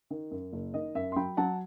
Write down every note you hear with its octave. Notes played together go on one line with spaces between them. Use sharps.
D#3
F#2
F#1
D#3 D#5
F#2 E5
C6
F#3 G5 B5
F#3 F#5 A5